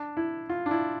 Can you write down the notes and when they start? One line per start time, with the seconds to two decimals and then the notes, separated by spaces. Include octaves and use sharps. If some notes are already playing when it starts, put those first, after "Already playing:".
Already playing: D4
0.17 E4
0.49 F4
0.66 D4
0.71 E4